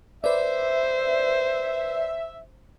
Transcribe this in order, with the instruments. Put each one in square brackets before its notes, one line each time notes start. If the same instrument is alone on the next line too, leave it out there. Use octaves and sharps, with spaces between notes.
[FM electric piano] B4 D5 [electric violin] C5 [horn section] E5